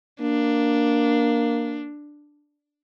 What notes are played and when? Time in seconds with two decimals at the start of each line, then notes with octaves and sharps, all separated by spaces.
0.21 A#3 D4